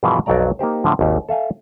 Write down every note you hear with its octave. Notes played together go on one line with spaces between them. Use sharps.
G2 B2 E3 F3 G#4 A#4
B1 F2 F#3 D5 A#5
A#3 D#4 G4 C5
A2 D3 F3
G#1 D#2
A4 E5 F5 G#5